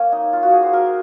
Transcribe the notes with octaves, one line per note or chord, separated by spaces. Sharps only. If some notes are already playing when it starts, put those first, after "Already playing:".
Already playing: A#3 C#4
D#4
F4
F#4
G#4
C5
A#4